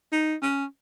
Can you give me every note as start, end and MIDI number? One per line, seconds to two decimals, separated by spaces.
0.12 0.35 63
0.42 0.65 61